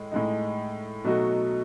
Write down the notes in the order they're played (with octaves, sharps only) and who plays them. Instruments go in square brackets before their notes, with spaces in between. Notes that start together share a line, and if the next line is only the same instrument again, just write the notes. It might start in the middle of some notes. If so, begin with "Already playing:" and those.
Already playing: [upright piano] A2 G#3
A2 G#3 D#4
B2 F#3 A3 D#4 F#4